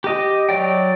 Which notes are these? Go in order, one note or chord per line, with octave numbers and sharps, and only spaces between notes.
G4 D#5
F#3 D5 G5